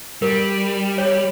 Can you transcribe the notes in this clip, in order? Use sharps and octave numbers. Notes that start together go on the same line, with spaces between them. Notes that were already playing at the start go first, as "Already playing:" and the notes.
G3 A#4
C#5